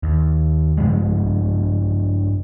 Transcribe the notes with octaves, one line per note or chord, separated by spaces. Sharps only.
D#2
G2 C#3 F3 G#3